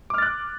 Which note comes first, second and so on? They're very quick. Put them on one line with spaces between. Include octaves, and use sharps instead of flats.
D6 F6 A6 F#6